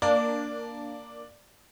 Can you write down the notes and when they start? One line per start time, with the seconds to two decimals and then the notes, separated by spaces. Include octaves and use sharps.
0.02 A#3 D4 D5 D6